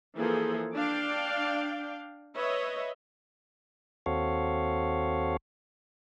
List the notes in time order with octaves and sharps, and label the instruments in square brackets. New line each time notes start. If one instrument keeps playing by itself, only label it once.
[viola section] E3 F3 A#3 G#4 A4
D4 D5 F5 G5
B4 C#5 D#5 E5
[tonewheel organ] D#2 C4 F#4 A4 C#5 F5